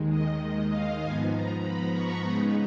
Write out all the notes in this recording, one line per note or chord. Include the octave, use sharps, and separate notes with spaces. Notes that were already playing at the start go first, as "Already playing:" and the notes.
Already playing: D#2 D#3 G#3
D#5
F5
G#2 F3 B3 G#5
A#5
B5
C#6
C#3 G#3 B3 D#4 B5